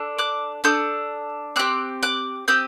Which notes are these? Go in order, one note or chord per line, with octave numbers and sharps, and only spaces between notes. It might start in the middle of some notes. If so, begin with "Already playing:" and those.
Already playing: D4 A4
D6 F#6
D4 A4 D#6 G6
C4 G4 D6 F#6
D6 F#6
C4 G4 D#6 G6